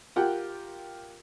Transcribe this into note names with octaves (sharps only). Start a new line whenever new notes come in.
F4 G4 A#4 F#5 G5